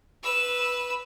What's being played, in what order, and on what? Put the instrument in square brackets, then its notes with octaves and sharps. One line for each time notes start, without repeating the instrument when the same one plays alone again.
[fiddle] B4 E6